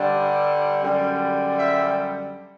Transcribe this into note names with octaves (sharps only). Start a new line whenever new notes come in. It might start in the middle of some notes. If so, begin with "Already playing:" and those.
Already playing: G2 D3 G3
F#2 D3 G3
E5